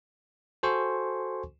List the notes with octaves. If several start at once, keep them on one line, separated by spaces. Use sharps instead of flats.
F#4 A4 C5 G#5 C6 C#6